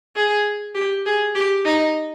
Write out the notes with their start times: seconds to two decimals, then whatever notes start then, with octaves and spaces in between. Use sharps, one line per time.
0.16 G#4
0.75 G4
1.06 G#4
1.35 G4
1.64 D#4